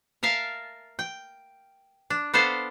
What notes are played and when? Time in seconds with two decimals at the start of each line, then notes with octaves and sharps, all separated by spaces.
0.23 A#4 E5 F5 A5
0.99 G5
2.10 D4
2.34 B3 D4 A4 C5 F5